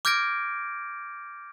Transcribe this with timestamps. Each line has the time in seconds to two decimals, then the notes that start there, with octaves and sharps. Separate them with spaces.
0.05 D6 F6 G6 G#6 A#6 D7